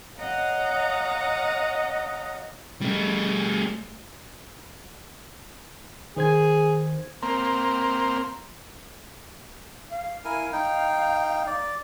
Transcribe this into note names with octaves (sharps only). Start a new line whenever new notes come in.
C#5 D#5 F5 F#5 A#5
G3 A3
D#3 G#4 C5 G#6
A#3 C4
F5
E4 A#4 G#5
D#4 G5
D5